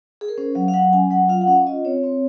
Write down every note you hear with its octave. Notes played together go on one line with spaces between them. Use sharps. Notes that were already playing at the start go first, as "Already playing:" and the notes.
G#4
A#4
C#4 C5
F#3 F5
F5
F#3 F#5
C#4 G#5
F#3 F#5
F4 F5
F#5
C#4 F5
F4 D#5
C4 C#5
C4